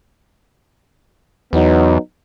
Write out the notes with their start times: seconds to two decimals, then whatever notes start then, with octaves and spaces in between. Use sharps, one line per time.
1.53 E2 F#3 B3 D#4